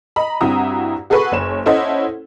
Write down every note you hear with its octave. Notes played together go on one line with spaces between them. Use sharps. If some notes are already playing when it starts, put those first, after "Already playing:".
D#5 A#5 B5
G2 C4 E4 F#4 A#5 D#6
F#4 G#4 A4 B4 B5 C#6
F#1 C#5 E7
C#4 E4 A4 C5 D#5 F#5